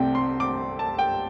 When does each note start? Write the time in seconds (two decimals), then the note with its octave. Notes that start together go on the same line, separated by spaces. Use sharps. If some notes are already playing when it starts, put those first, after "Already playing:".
Already playing: C2 C3 A3 C4 G5
0.15 C6
0.40 D6
0.79 A5
0.99 G5